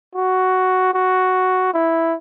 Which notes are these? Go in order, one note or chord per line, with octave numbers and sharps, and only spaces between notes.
F#4
F#4
E4